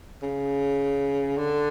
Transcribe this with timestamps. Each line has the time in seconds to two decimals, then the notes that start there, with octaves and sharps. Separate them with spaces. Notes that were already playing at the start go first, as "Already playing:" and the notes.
0.22 C#3
1.38 D3